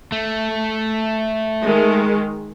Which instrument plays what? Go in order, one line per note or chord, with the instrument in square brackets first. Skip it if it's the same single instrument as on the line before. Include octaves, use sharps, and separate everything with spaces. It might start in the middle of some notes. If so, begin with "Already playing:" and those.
[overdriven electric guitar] A3
[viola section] D#3 G#3